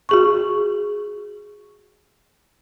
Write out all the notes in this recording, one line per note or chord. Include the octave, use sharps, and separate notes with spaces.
F#4 G#4 C#6